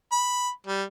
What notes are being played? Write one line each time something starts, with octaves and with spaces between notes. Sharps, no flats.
B5
G3